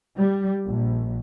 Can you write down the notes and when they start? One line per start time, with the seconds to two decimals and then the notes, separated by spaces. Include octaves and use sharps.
0.15 G3
0.67 A#1